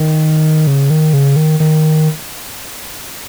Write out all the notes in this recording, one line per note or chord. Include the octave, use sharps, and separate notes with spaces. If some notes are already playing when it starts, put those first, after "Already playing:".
Already playing: D#3
C#3
D#3
C#3
D#3
D#3